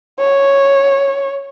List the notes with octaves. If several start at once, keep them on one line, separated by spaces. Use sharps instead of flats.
C#5